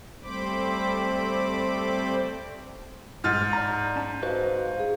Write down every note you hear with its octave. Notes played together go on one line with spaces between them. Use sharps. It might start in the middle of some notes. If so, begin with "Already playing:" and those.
G3 A3 C4 C5 B5 D6
G#2 F6 A6
D5 A#5
C#4 A5
F#4 B4 C5 D#5 F5
G#4